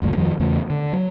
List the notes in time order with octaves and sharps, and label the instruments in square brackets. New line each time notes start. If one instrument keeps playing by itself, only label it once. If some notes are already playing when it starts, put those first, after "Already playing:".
[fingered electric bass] F#1 D2 G2 A#2
F2 D#3 F3 G3
E2 C#3 A3
D3
F#3